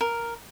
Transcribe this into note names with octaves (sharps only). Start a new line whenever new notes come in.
A#4